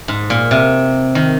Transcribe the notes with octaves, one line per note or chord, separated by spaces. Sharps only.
G#2
A#2
C3
D#3